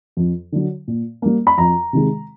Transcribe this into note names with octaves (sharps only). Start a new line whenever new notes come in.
F2
D3 F#3
A#2
G3 A#3
B5
F2 A#5
C3 D#3 G#3